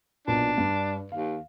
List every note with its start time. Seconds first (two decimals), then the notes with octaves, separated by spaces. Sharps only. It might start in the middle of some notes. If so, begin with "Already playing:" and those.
0.27 B1 A#2 D4
0.58 G2
1.12 D#2 F5